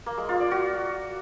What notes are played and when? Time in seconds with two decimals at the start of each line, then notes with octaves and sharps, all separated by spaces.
0.06 A#3
0.18 G#3
0.29 F4
0.40 D5
0.51 F#4